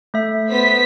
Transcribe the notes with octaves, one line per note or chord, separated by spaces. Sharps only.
A3 E5
B3 C5 B6